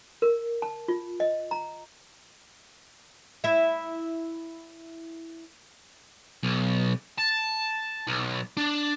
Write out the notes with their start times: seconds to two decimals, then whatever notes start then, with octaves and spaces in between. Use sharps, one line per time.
0.22 A#4
0.62 A5
0.88 F4
1.20 D#5
1.51 A#5
3.44 E4 E5
6.43 B1
7.18 A5
8.07 B1
8.57 D4